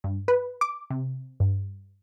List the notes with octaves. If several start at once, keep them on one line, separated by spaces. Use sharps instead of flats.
G2
B4
D6
C3
G2